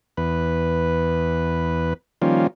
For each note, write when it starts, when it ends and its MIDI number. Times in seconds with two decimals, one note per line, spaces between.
0.17 1.94 40
0.17 1.94 71
2.22 2.47 51
2.22 2.47 53
2.22 2.47 55
2.22 2.47 58
2.22 2.47 61
2.22 2.47 65